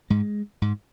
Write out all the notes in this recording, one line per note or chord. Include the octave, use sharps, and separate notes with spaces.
G#2 G#3
G#2